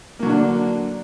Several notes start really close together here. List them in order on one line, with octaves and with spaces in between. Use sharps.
A#3 F#3 D3 D4